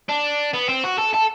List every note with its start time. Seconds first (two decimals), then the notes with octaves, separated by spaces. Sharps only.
0.09 D4
0.54 B3
0.69 C4
0.84 F#4
0.98 A4
1.13 A4